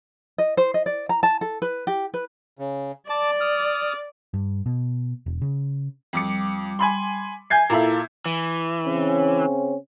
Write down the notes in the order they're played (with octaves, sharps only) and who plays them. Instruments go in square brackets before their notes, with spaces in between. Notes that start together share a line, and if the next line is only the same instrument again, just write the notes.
[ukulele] D#5
C5
D#5
D5
A#5
A5
A4
B4
G4
B4
[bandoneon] C#3
[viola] D5 [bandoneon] A5 D6
[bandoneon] D#6 F6
[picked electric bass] G2
B2
E1
C#3
[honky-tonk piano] F2 D6 C#7 [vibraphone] G3
[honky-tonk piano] G#5 B5 C6
[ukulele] E5 G#5 [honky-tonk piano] G6 G#6 C7
[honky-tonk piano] A#2 A4 E5 [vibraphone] E4 F5 [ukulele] A#5 B5
[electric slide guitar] E3
[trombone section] C#3 C4 C#4